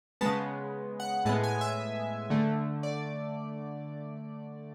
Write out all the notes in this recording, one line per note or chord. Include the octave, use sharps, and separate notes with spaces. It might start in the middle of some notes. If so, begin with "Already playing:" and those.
C#3 G#3 B3 A5
F#5
A2 G#3 B3 A5
G#5
E5
D3 A3
D5